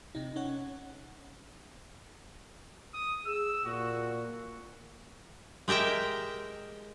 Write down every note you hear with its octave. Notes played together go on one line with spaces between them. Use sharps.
C3 D#4
C#4 C#5 F#5
D#6
G#4 E6
A#2 F#4
G#3 G4 A#4 E5 G5